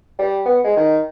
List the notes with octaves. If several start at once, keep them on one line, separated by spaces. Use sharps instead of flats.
G3
B3
G#3
D#3